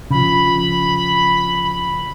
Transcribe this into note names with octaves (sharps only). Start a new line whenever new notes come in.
C#3 F3 B5